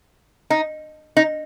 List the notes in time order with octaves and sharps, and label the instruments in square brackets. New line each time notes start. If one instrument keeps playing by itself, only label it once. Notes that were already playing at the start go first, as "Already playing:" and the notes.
[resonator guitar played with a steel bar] D#4
D#4